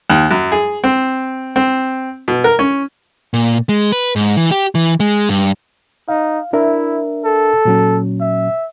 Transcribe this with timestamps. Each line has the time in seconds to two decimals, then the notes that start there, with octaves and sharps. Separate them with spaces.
0.10 D#2
0.31 F#2
0.52 G#4
0.84 C4
1.56 C4
2.28 B2
2.44 A#4
2.59 C#4
3.34 A#2
3.69 G#3
3.92 B4
4.16 G#2
4.37 E3
4.51 G4
4.75 E3
5.00 G#3
5.29 G2
6.09 D#4 F5
6.53 D4 E4 A#4 E5
7.25 A4
7.65 A#2 F#3 C#4
8.20 E5